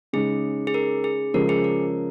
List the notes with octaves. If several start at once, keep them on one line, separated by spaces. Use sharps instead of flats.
C#3 G#3 D#4 G#4
G#4
A#4
G#4
C#3 F3 G#3 A#4
G#4
A#4